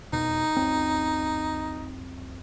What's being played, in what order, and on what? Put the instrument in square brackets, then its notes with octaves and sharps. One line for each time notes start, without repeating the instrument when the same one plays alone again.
[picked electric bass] E1 F2 B2 [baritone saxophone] D#4
[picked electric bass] C#2 F#2 C4